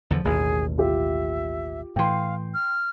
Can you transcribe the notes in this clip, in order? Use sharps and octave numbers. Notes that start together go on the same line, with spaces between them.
E2 D3 F3
A1 D#2 B2 G#4
F4 G4 E5
A2 E3 F5 G5 C6
F6